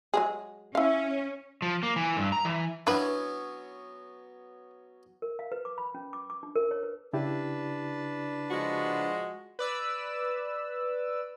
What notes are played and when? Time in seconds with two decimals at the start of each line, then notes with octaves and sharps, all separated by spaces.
0.14 F#3 G#3 G#4
0.75 C#4 E4 F5
1.62 F3
1.83 A#3
1.96 E3
2.17 G2
2.32 A#5
2.45 E3
2.87 F#3 B3 C#4 D4 E4 B4
5.22 A#4
5.39 F5
5.52 B4
5.65 D6
5.78 B5
5.95 C#4
6.13 D6
6.30 D6
6.43 D4
6.56 A#4
6.71 C#5
6.83 B4
7.13 C#3 D4 E4 G4 B4 A5
8.51 F3 G#3 F#4
9.59 B4 D5 E6